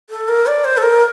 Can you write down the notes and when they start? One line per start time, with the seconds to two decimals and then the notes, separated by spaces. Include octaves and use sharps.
0.10 A4
0.28 A#4
0.47 D5
0.64 C5
0.77 A4
0.83 A#4